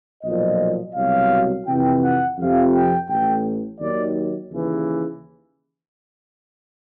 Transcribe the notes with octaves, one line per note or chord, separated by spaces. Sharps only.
B1 A#2 F3 D#5
C2 B2 F#3 F5
F2 C3 E3 G5
F#5
F2 C3 F3 F5
G5
A1 A2 E3 G5
D#2 D#3 F#3 D5
D#2 C#3 E3